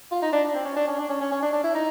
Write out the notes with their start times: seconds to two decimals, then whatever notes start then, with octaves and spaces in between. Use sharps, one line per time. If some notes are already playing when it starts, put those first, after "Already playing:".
0.11 F4
0.22 D#4
0.32 D4
0.54 C4
0.65 C#4
0.76 D4
0.88 C#4
0.98 D4
1.09 C#4
1.21 C#4
1.32 C#4
1.42 D4
1.53 D4
1.64 E4
1.75 D#4